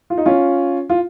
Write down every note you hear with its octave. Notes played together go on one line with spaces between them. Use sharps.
F4
D#4
C#4 F4
F4